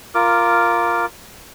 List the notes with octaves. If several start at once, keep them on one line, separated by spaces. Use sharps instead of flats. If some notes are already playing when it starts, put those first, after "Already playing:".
F4 A#4 D6